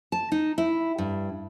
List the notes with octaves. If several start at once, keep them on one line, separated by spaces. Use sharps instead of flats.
A5
D#4
E4
G2